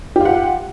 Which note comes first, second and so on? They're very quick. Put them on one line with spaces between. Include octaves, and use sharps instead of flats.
G4 F4 F#5